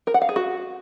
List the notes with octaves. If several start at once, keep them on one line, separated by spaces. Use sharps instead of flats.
A#4
F#5
F5
G#4
F#4